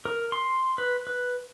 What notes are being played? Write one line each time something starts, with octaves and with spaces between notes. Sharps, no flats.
A#4
C6
B4
B4